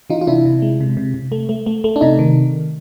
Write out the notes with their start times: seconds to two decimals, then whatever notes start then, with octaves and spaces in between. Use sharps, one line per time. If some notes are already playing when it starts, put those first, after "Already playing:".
0.10 E3 D#4 F4
0.21 F4
0.27 C3 D4 E4
0.45 C3
0.62 G#3
0.80 C3
0.97 C3
1.14 C3
1.32 A3
1.49 A3
1.66 A3
1.84 A3
1.96 D4
2.01 C3 D#4
2.19 D#3